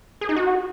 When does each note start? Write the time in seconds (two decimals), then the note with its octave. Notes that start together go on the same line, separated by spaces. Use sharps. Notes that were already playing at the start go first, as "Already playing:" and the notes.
0.21 G#4
0.29 D#4
0.36 F#4